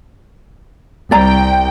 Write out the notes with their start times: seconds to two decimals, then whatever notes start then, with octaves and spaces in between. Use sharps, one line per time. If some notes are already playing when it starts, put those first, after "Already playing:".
1.11 C2 D5 G5 A#5